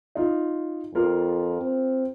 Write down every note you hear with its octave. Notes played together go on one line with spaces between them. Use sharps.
D#4 F4
F2 F4 A#4
C4